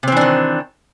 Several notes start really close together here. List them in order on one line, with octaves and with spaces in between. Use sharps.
C3 C4 E3 D4 D#3